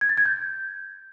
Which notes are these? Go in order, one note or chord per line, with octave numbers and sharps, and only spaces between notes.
G#6
A6
G#6
G6